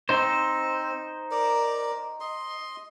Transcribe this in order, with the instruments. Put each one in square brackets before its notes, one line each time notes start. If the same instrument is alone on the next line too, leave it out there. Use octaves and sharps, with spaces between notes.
[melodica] C4 [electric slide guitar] D#4 C5
[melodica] A#4 D5
D#5 C6